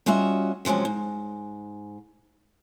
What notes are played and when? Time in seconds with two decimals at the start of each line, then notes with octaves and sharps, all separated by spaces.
0.06 G3 C#4 F4 F#4 D#5 E5
0.65 C3 F3 F#3 G#3 C#4
0.85 G#2